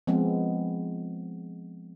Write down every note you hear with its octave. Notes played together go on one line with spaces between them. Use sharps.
F3 G#3 B3 C4